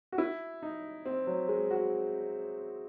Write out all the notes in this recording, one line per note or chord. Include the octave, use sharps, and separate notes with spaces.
F#4
E4
D#4
C4
F#3
G#3
F#4